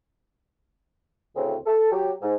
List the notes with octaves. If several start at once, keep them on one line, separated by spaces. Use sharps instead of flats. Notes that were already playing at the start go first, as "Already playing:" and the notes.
D2 A2 C#3 C4
A4
F#3 G4
G#2